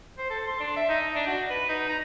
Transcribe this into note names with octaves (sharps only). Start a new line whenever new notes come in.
C5
A4
C6
D4
E5
D#4
D4
F#4
B4
D#4
A#5